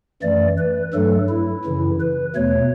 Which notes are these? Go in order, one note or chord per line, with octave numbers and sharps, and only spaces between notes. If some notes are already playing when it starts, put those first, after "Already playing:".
F#2 E3 A3 D5
B4
G2 F#3 A3 A4
E4
F#2 C#3 E3
B4
E2 B2 A3 C#5